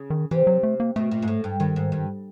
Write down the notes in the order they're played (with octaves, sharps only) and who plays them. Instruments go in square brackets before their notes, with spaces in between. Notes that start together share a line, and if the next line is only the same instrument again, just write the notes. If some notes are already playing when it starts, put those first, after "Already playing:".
Already playing: [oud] C#3
[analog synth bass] D#3
[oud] C3 [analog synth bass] E3
[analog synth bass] F#3
A3
A#3
[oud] B2 [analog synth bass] A3
[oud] A#2
G#2
A2
G2
[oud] G2 [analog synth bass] D#3
[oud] G#2
G2